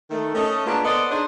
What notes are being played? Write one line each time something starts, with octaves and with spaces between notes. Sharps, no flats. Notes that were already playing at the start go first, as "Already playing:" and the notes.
D#3 A3
A3 C#4 D#5
G#3 A#3 B3 D4 F4
B3 A4 C5 D5 D#5 F#5
D4 D#4 G#4 C5 C#5 D#5